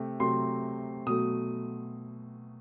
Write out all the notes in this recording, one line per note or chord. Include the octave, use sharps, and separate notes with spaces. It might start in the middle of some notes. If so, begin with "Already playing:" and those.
Already playing: C3 A3
C3 F#3 A3 C6
B2 F#3 A3 D#6